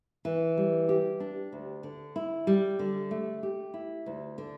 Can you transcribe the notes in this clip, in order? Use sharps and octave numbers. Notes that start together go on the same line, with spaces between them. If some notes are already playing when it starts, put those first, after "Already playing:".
E3
G3
G4
D4
D2
D3
E4
G3
D3
A3
G4
E4
D2
D3